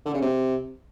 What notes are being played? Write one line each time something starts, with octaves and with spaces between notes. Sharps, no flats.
D3
C#3
C3